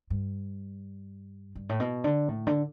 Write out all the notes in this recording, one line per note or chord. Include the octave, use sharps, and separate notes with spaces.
G2
G2
A2
B2
D3
A2
D3